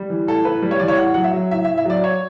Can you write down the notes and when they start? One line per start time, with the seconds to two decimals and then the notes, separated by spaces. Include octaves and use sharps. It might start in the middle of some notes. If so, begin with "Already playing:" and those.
Already playing: G3
0.10 E3
0.27 A2 A4
0.45 A2 B4
0.62 G3
0.71 C#5
0.79 E3 D5
0.88 C#5
0.97 A2 F#5
1.14 F#3 F#5
1.24 E5
1.33 F#3
1.51 A2 E5
1.65 A2 E5
1.78 E5
1.85 F#3 D5
2.04 C#5